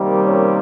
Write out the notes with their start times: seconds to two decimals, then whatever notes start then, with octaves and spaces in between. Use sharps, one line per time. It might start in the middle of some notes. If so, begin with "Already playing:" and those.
Already playing: C3 D#3 G3 A#3
0.22 C#4